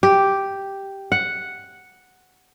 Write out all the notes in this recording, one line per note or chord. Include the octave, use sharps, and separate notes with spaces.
G4
F#5